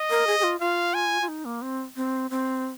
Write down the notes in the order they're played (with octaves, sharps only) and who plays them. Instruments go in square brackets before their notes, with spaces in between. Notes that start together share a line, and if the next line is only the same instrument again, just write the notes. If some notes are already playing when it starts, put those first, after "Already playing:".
Already playing: [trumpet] D#5
[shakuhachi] A#4
G#4
G#4
F4
[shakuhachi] F4 [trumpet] F5
[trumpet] G#5
[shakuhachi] F4
D#4
A#3
C4
C4
C4